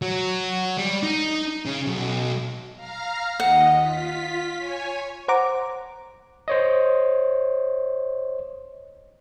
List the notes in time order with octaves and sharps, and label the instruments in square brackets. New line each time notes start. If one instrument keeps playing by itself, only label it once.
[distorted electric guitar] F#3
G3
D#4
C#3
B1
[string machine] F5 A#5 F6
[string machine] D#2 D#5 [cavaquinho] F#5
[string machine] F4 B6
C#5 G#5
[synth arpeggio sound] C5 F#5 A#5 D6
[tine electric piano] C5 C#5 D#5